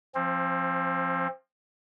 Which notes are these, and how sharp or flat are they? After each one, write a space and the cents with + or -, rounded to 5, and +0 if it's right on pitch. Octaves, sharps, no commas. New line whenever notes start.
F3 -5 C4 +25